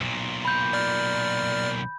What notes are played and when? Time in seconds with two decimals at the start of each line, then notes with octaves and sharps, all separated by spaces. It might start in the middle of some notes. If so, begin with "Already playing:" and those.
0.01 B1 A#2
0.45 B5 G6
0.73 D5 F6